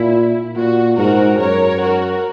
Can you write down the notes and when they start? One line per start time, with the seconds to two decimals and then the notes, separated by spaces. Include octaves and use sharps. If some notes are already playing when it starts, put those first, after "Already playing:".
Already playing: A#2 E4
0.56 A#2 F#4
0.97 G#2 F#4 A#4
1.39 F#2 A#4 C#5
1.81 F#4 A#4